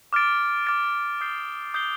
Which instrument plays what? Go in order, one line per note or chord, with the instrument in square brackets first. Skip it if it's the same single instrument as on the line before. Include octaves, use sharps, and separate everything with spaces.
[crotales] D6 F6 A6 D7
D6 F6 A6 D7
D#6 G6 C7 G7
D#6 G6 C7 G7